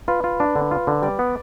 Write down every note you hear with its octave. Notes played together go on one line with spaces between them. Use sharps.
F4 B4
F4
D4
D3
F4
D3
G3 D5
B3